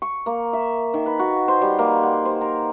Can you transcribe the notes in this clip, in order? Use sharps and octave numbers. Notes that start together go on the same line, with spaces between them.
C#6
A#3
E5
D#3
B4
F#4
C5
G3
A#3
F#5
C5
A#4